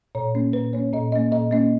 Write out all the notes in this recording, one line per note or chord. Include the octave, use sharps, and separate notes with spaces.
A#2 C#5
A#3 C#4
A#2 B4
A#3 C#4 C#5
A#2 D#5
A#3 C#4 D#5
A#2 D#5
A#3 C#4 D#5